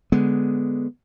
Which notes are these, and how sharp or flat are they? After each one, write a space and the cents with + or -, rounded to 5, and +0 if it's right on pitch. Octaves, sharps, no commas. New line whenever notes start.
D3 +0 G#3 +0 B3 +5